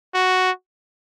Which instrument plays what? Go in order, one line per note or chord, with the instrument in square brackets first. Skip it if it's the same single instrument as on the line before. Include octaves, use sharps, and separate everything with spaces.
[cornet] F#4